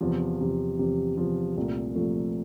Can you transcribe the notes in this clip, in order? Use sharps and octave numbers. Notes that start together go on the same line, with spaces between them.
E2 C3 F3
E2 C3 F3
E2 C3 F3
E2 C3 F3
C2 A#2 F3 A3
C2 A#2 F3 A3